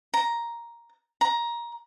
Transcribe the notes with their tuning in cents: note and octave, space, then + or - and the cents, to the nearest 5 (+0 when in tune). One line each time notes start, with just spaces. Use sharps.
A#5 +5
A#5 +15